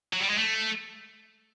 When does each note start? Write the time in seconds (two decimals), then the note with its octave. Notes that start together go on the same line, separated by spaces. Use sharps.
0.13 F#3
0.20 G3
0.30 G#3
0.38 A3